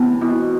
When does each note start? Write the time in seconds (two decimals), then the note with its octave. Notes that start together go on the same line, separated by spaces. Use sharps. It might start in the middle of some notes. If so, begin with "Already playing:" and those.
Already playing: C3 E3 B3
0.21 B2 E4